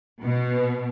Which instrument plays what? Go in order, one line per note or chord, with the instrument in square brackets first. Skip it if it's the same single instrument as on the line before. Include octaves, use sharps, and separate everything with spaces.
[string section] B2